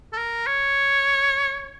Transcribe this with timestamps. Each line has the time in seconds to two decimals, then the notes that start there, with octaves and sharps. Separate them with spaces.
0.13 A4
0.17 A#4
0.47 C#5